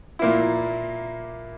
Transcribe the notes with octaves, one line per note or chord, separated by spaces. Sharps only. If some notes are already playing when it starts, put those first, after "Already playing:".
A#2 A#3 E4